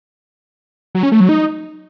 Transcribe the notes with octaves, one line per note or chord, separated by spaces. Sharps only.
F#3
C#4
A3
F#3
D#4